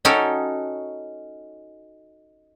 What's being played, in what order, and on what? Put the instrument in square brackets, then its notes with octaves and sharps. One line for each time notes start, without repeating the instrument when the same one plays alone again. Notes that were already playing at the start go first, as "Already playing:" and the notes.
[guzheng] C#4 D#4 F#4 A4 C#5 G5